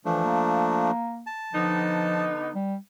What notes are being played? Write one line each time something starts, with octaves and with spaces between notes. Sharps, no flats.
E3 F3 A3 D4
A#3
A5
D3 F3 B3 D#4
G3